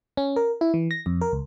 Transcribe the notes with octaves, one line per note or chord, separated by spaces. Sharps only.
C#4
A#4
E4
E3
A#6
F2
A#4
C#2